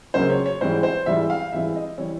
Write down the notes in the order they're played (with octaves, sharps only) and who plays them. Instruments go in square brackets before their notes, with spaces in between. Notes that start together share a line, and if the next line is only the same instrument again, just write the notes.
[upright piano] C#2 C#3 F#3 A#3 C#4 C5
C#5
C#5
G#2 E3 G3 C4 C5
C5
G#2 E3 G3 C4 E5
F5
G#2 E3 G3 C4 E5
D#5
E3 G3 C4 C#5